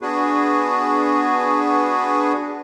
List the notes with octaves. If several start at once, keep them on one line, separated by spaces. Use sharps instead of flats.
B3 D4 F#4 G#4 B4